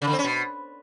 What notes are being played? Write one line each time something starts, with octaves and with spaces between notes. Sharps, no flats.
C#3
D3
C4
C#4
B2